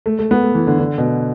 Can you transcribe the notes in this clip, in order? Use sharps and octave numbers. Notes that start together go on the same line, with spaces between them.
A3
A3
B3
A3
E3
D3
D3
B2